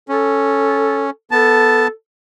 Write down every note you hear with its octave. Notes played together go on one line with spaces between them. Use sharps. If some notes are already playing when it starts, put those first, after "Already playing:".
C#4 A4
B3 A4 A5